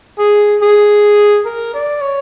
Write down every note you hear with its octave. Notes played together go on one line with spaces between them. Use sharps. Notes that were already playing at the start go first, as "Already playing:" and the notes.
G#4
G#4
A#4
D5
C#5